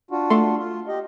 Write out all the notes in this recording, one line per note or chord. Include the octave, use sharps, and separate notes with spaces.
D4 F4 F#4
A3 C6
F4
G4 D#5